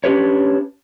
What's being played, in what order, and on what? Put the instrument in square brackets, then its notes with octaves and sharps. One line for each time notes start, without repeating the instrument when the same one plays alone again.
[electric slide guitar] C#4 D4 G4 B4 C#5